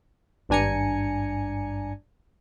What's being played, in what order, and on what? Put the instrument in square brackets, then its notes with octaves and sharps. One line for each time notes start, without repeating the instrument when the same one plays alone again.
[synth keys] G#1 G2 D4 G#5 A#5 C#7